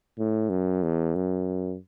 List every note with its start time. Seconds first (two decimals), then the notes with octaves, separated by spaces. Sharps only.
0.19 A2
0.50 F#2
0.83 E2
1.15 F#2